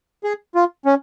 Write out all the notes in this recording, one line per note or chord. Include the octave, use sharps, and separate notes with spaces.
G#4
F4
C#4